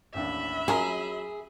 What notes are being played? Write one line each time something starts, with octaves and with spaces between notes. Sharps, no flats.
A1 D#2 D4 E5 B5
F#3 C#4 F4 G#4 A#4